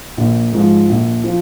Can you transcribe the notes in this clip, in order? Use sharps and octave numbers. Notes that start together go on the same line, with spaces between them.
A#1
G#2 F3
A#1
F3